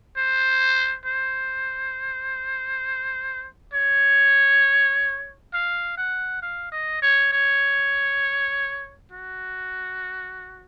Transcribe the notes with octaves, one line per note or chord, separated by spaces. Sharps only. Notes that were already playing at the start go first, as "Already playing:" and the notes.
C5
C5
C#5
F5
F#5
F5
D#5
C#5
C#5
F#4